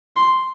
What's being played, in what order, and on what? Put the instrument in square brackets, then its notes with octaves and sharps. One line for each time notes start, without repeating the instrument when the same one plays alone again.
[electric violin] C6